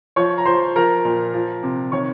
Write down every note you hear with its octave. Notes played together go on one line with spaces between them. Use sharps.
F3 C#5 C#6
A#5
F3 C5 C6
F3 A#4 A#5
A#2
F3
C3
D#3 C#5 C#6